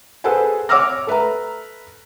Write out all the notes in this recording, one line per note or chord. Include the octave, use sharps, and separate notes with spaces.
G#4 A4 B4 C5 F#5 G#5
C#5 F#5 D6 E6 F6 A#6
A4 B4 E5 A#5